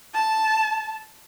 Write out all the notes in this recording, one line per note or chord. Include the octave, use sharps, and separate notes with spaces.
A5